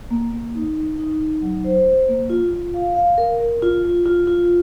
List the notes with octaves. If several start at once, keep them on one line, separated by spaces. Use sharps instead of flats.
A#3
A#3
D#4
D#4
D#4
D#4
F#3
C5
C5
A#3
F4
F4
F5
F5
A#4
A#4
F4
F4
F4
F4